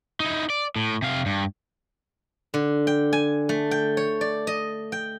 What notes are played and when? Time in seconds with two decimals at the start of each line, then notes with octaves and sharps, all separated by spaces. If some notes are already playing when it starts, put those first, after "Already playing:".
0.20 D#4 E4
0.50 D5
0.76 A2
1.02 C3 F5
1.26 G2
2.54 D3
2.87 G5
3.13 G#5
3.49 A3
3.71 G5
3.97 C#5
4.21 D5
4.47 D#5
4.92 G5